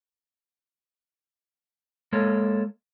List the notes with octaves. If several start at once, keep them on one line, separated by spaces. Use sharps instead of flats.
G#3 A#3 A4 C#5